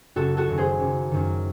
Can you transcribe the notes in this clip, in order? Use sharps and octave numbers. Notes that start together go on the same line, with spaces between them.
F#1 F#4 A4
F#4 A4
F#2 D#3
G#4 C5
F#1
F#2 D#3